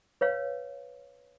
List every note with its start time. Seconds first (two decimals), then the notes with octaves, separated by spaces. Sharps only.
0.21 B4 C#5 F5